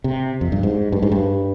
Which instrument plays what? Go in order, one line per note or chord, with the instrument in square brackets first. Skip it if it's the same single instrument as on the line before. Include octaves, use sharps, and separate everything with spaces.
[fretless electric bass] C3
F2
G2
G#2
G2
G#2
G2